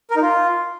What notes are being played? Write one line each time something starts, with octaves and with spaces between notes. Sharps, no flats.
A#4
D#4
F4